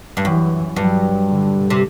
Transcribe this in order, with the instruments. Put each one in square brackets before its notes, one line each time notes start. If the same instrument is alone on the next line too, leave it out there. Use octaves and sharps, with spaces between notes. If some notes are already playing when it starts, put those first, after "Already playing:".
[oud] G2
[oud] F#2 [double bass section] E3
[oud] G2 [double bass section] F#3
[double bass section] D3
[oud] C3